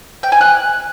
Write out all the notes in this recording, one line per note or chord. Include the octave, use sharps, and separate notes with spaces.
G5
G#5
F#6